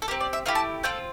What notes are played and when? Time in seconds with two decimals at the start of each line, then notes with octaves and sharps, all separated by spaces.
0.02 A4
0.08 G4 A#4
0.11 C4
0.21 D5
0.33 E5
0.46 A3 E4 G4 F5
0.55 A5
0.83 C4 F4 A4 G5